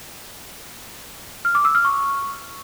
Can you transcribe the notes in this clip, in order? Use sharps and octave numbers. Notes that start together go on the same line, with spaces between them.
F6
D6
E6
F6
C#6